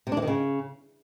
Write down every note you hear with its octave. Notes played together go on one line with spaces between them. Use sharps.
C3
D4
E3
D#3
C#3